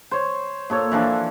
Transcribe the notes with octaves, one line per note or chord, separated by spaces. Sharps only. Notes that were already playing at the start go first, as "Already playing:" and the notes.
C5 C#5
A#2 A4 C#5
E3 F3 D4 A4